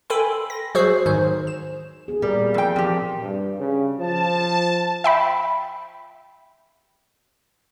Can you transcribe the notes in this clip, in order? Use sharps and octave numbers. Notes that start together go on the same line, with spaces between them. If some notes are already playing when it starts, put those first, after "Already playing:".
A4 G5 G#5 B5 C6
A#6
F#3 F#4 G#4 C5 E6 C7
G#2 D#3 C5
E7
B3 G#4
A#2 G3 A#4 D5
F2 G5
F3 C4 G4
G2
C#3
F3 A5
E5 G5 B5